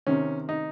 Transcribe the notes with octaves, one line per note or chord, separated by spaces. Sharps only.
C3 D#3 C#4
D#4